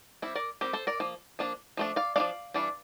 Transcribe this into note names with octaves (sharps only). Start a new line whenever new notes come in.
G3 C4 E4
A#4 D5
G3 C4 G4 A#4
A4 C5
A#4 D5
F3 A#3
F3 A#3 D4
F3 A3 D4
D5 F5
F3 A3 D4 D5 F5
E3 G3 D4